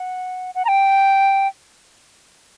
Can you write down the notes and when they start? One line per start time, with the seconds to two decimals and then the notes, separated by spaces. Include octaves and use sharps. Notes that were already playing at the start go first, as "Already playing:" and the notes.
Already playing: F#5
0.55 F#5
0.65 A#5
0.68 G5